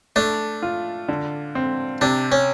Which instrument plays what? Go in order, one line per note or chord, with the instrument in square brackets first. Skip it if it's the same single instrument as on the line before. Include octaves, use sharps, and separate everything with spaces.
[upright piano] A3 [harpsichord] D4
[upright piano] F4
D3
C4
[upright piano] C3 [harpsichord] D4
[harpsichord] C#4